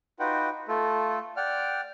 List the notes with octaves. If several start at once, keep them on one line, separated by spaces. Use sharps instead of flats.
D#4 F4 F#4 B4 F#5 G5
A3 F4 A4
D5 F#5 G5 F6